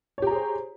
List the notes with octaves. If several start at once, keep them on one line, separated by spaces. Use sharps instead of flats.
G4 G#4 C5 C#5 A#5